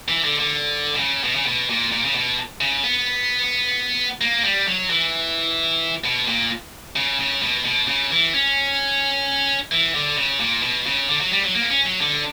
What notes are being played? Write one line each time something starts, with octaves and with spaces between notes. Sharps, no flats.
E3
D3
D3
B2
C#3
B2
C#3
B2
A#2
A#2
C#3
B2
C#3
B3
A#3
G3
F#3
E3
B2
A#2
C#3
C#3
B2
B2
C#3
E3
C#4
E3
D3
C#3
A#2
B2
C#3
D3
F#3
G3
F#3
A#3
B3
C#4
F#3
D3